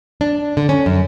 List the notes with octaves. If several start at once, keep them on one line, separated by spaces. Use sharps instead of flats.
D4
D3
C#4
F#2